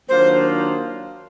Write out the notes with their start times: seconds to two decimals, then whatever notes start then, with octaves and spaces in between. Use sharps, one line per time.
0.09 D#3 F#3 A#3 D4 F4 C5